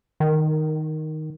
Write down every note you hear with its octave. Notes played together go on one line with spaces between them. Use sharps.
D#3